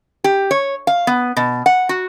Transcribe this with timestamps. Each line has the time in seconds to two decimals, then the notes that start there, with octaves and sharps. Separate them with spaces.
0.24 G4
0.51 C#5
0.87 F5
1.07 B3
1.37 B2
1.66 F#5
1.89 F#4